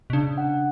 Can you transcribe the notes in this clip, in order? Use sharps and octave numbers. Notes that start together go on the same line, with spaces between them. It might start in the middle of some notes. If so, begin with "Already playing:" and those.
B2
C#3 D4
F#5